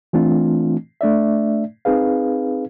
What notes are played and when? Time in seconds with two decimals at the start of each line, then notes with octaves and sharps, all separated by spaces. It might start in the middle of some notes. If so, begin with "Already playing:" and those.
0.13 E3 A3 C4 D4 F4
1.01 A3 D4 D5 E5
1.85 C4 D#4 G#4 B4 F5